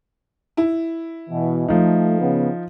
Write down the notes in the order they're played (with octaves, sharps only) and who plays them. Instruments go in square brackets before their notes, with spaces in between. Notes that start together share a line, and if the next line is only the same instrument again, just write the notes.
[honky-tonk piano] E4
[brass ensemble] B2 E3
[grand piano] F3 D#4 [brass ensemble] A3
[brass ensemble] C#3 B3